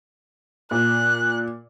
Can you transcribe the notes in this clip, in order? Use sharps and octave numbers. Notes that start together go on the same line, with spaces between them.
A#2 F#6